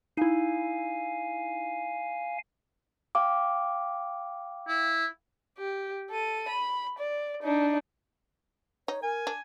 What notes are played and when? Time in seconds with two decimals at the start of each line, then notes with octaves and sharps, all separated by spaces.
0.17 D#4 E4 F5 G#5
3.15 F5 G5 D6
4.68 E4
5.58 G4
6.11 A4 D#7
6.49 B5
6.99 D5
7.43 D4 D#4
8.88 D#4 C#5
9.03 A#4 G#5
9.27 D4